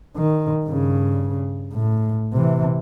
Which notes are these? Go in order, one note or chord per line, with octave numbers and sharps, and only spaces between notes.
D#3
G2 C#3
A2
C3 E3